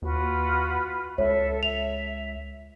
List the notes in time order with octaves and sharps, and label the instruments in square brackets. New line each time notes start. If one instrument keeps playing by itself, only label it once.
[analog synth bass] D#2 [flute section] F4 F#4 B4
[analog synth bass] C#2 [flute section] A4 E5 [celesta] C#5
[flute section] E5 [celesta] F7